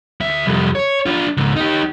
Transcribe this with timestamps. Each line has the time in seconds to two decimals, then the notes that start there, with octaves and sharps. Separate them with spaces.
0.21 D2 E5
0.46 C2 F2
0.75 C#5
1.06 D4 F4
1.37 C#2 G#2
1.56 D#4 G4